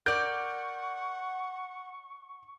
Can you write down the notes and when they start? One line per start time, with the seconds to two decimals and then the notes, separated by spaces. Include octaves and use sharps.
0.06 A#4 D5 F#5 C#6 G6 D7